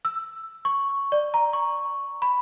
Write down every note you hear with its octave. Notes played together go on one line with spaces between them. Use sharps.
E6
C#6
D5
A#5
C#6
B5